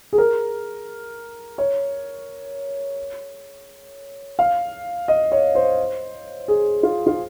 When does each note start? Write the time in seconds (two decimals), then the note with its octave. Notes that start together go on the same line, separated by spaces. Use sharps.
0.13 G#4
0.18 A#4
1.58 C#5
4.39 F5
5.08 D#5
5.32 C#5
5.55 C5
6.48 G#4
6.83 F4
7.07 F4